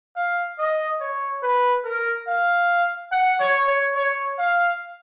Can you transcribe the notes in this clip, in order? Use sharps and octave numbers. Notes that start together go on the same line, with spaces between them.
F5
D#5
C#5
B4
A#4
F5
F#5
C#5
C#5
C#5
F5